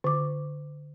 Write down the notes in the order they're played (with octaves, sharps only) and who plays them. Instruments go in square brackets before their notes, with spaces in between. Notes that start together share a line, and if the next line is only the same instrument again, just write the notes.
[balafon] D3 D6